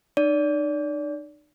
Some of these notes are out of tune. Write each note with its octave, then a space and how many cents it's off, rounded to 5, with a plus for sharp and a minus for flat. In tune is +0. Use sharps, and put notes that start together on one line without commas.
D#4 -45 D5 -30